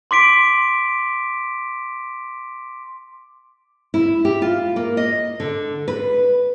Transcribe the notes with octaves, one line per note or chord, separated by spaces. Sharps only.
C6 D6 B6 D7
E4
G4
F4
A#3
D#5
D3
B4